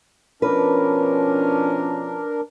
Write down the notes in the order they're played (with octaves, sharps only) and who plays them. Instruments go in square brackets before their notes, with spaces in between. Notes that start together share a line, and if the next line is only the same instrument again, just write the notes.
[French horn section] B2 F3 C#4 [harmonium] D4 A#4 [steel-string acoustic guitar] B4